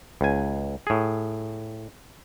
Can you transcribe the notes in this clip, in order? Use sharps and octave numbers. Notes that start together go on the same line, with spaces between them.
C#2 G#5
A2 G#4